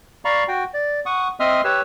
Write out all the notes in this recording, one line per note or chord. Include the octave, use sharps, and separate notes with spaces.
D5 F5 A#5 B5 C#6
F#4 G5
D5
F#5 C#6 D#6
C4 D#5 E5 C6 D#6 F6
G4 B4 C#5 E6